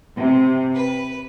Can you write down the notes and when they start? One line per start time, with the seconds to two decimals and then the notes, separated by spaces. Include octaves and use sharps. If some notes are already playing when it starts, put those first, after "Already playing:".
0.18 C3
0.75 B4